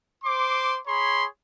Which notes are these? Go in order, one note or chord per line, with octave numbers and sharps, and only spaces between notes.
C5 C6 D6
G#4 C#5 B5 C6